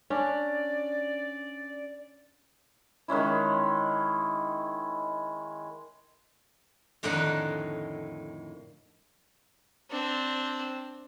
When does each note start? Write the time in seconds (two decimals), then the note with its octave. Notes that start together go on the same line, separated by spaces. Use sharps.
0.10 C#4 D4 D5
3.08 D#3 G#3 C#4 E4
7.03 F2 A2 D3 D#3 D#4 F#5
9.90 C4 D4